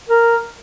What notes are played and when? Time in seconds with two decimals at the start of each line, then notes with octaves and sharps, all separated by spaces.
0.09 A#4